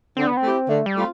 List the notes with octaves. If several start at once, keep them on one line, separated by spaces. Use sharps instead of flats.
D3 C4
B3
C4
A3 E4 G4
D3 A3
G3
A3 C4 F4